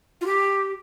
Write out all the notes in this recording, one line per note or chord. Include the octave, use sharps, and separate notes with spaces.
F4
G4